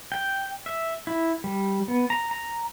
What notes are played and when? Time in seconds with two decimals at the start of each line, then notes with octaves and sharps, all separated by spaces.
0.12 G5
0.66 E5
1.07 E4
1.44 G3
1.88 B3
2.10 A#5
2.31 A#5